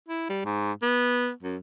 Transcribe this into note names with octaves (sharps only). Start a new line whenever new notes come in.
E4
G3
G#2
B3
F#2